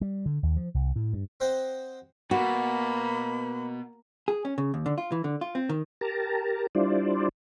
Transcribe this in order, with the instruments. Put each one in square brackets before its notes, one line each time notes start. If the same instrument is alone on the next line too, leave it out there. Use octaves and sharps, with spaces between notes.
[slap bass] G3
D3
D#2
F3
C2
A2
G2
[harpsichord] C4 C5 D#5 F#5
[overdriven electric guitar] B2 [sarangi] A#3 [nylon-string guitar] F#4 [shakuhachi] B5
[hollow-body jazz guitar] G#4
C#4
C#3
D#2
D3
F4
E3
D3
F4
C4
D#3
[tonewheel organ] G4 A#4 A5 A#5
G3 D4 E4 F4 C5 D5